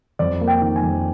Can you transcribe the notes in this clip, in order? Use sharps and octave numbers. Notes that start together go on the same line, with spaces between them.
F2 D5
A#3
G5
D#3
G#5
F2